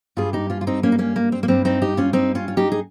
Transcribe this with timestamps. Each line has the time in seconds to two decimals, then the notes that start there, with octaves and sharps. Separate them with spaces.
0.17 G2 G3 F4 G#4
0.33 D#4 G4
0.50 C#4 F4
0.61 F4
0.67 C4 D#4
0.83 A#3 C#4
0.92 D#4
0.98 A#3 C#4
1.16 A#3
1.32 C4
1.43 A#3
1.48 G2 G3 C4
1.65 C4 D#4
1.82 D#4 G4
1.97 C#4 F4
2.13 C4 D#4
2.35 C#4 F4
2.48 F4
2.57 D#4 G4
2.72 G#4